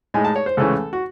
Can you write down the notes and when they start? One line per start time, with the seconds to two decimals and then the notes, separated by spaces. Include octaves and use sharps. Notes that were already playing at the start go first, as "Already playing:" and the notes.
0.14 A2 G#3 D#4 G#5
0.24 A5
0.36 C#5
0.46 C5
0.57 C#2 C#3 E3 A3 C#4 A4
0.93 F#4